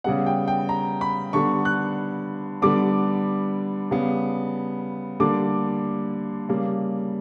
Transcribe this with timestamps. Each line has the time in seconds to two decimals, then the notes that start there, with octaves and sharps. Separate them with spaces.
0.04 C#3 G3 B3 F#5
0.26 G5
0.48 G5
0.69 A#5
1.01 B5
1.33 D3 G3 B3 C#6
1.65 F#6
2.62 D3 G3 B3 D6
3.91 C#3 G3 B3
5.20 D3 G3 A#3 D6
6.49 C#3 G3 A#3